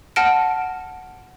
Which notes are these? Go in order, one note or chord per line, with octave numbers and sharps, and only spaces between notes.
F#5 A5 F6 A#6 D7